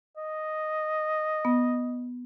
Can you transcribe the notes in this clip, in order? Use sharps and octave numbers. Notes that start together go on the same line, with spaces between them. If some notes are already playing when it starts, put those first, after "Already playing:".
D#5
B3